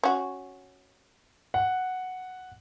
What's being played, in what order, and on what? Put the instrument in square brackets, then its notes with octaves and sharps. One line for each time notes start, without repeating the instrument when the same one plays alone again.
[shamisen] C#4 F#4
[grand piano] F#5